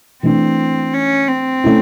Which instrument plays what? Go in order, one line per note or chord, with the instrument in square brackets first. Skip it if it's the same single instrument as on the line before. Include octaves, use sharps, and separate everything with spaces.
[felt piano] E3 A3 D4 [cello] C4
[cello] C#4
C4
[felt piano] A3 C#4 E4